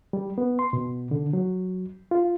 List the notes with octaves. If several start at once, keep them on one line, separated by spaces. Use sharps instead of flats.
G3
B3
C6
B2
D3
F#3
F4